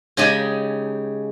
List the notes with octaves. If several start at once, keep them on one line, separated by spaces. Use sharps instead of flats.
C#3 G#3 D#4 G4 D#5 G#5